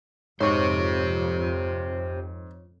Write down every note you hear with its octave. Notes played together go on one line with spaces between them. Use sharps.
F2 G#2 G4 C5 C#5 C#6